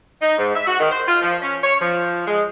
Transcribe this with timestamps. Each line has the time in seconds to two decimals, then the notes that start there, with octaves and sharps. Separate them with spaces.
0.21 D#4
0.38 G#2
0.54 E5
0.67 F#4
0.80 D#3
0.91 C5
1.07 F4
1.22 F3
1.42 C#4
1.63 C#5
1.80 F3
2.27 G#3